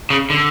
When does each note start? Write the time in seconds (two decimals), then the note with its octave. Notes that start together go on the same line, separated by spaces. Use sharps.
0.10 C#3
0.30 D3